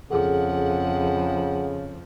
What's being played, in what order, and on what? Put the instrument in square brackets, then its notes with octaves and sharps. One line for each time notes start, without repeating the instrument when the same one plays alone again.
[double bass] F2 F3 [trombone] C#3 [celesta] G#4 A4 [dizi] F#5